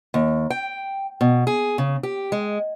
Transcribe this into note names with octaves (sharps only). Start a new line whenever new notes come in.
D#2
G5
B2
G#4
C#3
G4
G#3